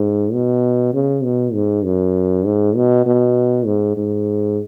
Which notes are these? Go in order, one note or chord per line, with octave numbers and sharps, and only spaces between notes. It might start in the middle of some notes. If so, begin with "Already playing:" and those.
Already playing: G#2
B2
C#3
B2
G#2
F#2
G#2
B2
B2
G#2
G#2